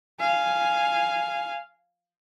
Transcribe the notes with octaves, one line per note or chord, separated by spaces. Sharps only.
F5 G#5